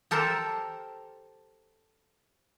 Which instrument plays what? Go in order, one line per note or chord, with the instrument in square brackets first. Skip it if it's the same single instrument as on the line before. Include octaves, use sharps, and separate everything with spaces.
[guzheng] G4 A4 A#4 C5 A#5